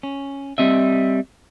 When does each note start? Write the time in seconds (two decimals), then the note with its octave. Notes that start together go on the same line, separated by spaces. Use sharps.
0.03 C#4
0.58 G3 C4 D#5 E5